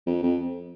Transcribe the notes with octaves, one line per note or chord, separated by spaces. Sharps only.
F2
F2